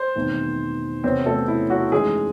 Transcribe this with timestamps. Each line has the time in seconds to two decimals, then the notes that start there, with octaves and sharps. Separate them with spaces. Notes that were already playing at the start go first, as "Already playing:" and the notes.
Already playing: C5
0.16 E1 E2 D#3 A3 C4
1.04 E2 C3 F#3 C4 C#4 C5
1.26 A3 A4
1.48 E4
1.70 F#3 F#4
1.92 F#2 E3 G#3 A3 D#4 G#4